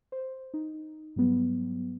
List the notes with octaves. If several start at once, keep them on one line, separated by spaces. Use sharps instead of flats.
C5
D#4
G#2 F#3 G3 B3